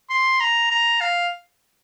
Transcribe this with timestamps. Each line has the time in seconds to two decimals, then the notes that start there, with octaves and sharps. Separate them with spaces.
0.10 C6
0.41 A#5
0.71 A#5
1.01 F5